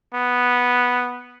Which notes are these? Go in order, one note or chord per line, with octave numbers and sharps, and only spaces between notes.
B3